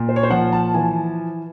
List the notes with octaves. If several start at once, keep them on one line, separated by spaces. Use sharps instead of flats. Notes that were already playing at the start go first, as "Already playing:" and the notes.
Already playing: A#2
C5
C#5
C5
F3 F#5
A5
E3 G#5